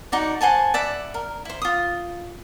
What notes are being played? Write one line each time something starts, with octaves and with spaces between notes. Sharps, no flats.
D#4 F#4 D5
C5 F#5 G#5 A5
D5 E5 F#5 B5
A#4
E4 C5
F4 D#6